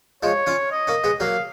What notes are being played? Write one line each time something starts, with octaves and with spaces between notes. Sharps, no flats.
F3 G#3 C#5
C#4 F4
D#5
A#3 C#4
G#3 B3
F#3 A#3 F5